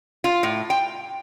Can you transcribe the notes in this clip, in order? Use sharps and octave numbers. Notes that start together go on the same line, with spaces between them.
F4
A2
G5